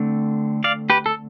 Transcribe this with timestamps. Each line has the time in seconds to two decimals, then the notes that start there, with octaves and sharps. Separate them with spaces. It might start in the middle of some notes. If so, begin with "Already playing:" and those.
Already playing: D3 A3 C4
0.64 D5 F5
0.90 G4 B4
1.06 A4